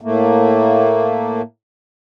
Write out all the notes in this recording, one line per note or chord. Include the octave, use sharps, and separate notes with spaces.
A2 A3 A#3